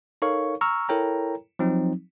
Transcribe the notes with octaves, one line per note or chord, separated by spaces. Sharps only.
D#4 A4 A#4 C#5 F5 C#6
A#5 C#6 E6 F6
E4 A4 A#4 C#5 G5 A#5
F3 F#3 C4 D#4